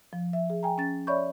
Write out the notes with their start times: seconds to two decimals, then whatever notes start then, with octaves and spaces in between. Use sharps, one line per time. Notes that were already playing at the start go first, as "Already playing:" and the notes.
0.13 F3
0.33 E5
0.50 G#4
0.63 G5 G#5 A#5
0.78 C#4 A6
1.07 C#5 D5 E5 B5 C#6 G6